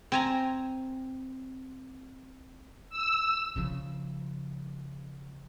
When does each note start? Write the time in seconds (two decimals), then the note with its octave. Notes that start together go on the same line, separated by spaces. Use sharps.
0.12 C4 G#5 A#5
2.90 E6
3.56 C#3 F3